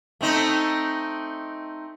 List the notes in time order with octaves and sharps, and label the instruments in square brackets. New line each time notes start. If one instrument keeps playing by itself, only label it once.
[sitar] A3 C4 D#4